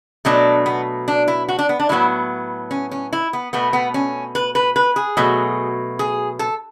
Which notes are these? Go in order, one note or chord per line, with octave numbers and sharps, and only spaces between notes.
B2 F#3 A3 D4
B3
D4
E4
F#4
D4
B3
D4
A2 F#3 B3 E4
C#4
C#4
E4
B3
B2 A3 B3
B3
C#4
B4
B4
B4
G#4
B2 F#3 A3
G#4
A4